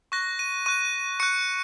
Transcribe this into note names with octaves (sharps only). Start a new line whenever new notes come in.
C#6 F#6 A#6
D#7
C#6 F#6 D#7
C#6 F#6 C#7